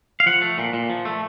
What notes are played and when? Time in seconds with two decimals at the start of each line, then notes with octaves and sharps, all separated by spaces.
0.20 F5
0.26 F3 F#5
0.42 A3
0.58 A#2
0.73 A#2
0.90 F3
1.05 A3